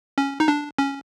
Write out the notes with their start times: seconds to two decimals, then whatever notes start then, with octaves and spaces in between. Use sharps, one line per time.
0.18 C#4
0.40 D#4
0.48 D4
0.78 C#4